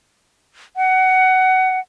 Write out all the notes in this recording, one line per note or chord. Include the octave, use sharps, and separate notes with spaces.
F#5